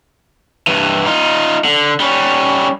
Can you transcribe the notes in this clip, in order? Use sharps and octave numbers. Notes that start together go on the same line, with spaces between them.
G2 E3
D#4 F4
D3
G3 C#4